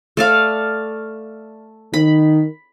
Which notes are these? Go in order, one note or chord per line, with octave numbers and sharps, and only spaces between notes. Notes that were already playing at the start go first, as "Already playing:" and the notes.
A3 D5 F5
D#3 B5